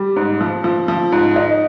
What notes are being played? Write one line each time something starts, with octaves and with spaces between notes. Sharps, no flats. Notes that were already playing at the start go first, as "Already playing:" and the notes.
Already playing: G3
G#2
F3
F3
F3
G#2
D#4